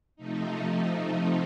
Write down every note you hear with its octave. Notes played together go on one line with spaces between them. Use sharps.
C3 F3 A3 D#4